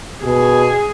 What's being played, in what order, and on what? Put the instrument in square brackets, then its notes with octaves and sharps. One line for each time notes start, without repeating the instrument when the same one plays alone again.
[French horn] B2 [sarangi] G#4